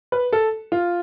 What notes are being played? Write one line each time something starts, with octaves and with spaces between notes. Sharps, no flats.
B4
A4
F4